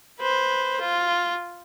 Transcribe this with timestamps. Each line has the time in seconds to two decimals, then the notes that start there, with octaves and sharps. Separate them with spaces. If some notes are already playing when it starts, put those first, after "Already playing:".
0.20 B4 C5
0.81 F4